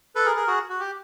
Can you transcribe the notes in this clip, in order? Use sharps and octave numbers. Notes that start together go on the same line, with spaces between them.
A4 B4
G#4 A#4
G#4 A#4
F#4 G#4
F#4
G4